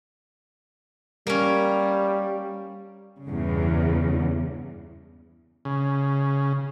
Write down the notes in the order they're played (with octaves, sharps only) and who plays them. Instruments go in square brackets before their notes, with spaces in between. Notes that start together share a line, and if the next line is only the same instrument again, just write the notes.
[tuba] G3 [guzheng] A#3 C#4
[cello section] E2 G2 C#3
[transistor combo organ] C#3